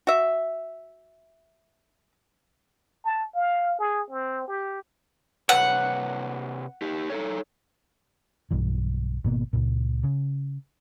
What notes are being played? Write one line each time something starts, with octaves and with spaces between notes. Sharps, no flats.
F#4 E5
A5
F5
G#4
C4
G4
C3 B4 C#5 F#5
D#4 G4
D#4 A4 C#5
B1 G2 E3
G#1 B2 A#3 B3
C#2 A#2
C#3